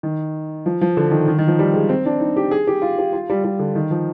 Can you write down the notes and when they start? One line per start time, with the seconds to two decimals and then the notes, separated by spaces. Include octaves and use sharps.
0.03 D#3
0.66 F3
0.81 F3
0.97 D3
1.11 D#3
1.28 D#3
1.38 D#3
1.48 F3
1.59 G3
1.74 G#3
1.89 C4
2.06 D4
2.20 D#4
2.36 G4
2.51 G#4
2.67 G4
2.82 F4
2.99 G4
3.13 F4
3.30 G3
3.44 G3
3.59 D3
3.75 D#3
3.91 F3